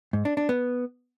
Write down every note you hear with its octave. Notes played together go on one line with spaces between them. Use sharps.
G#2
D4
D4
B3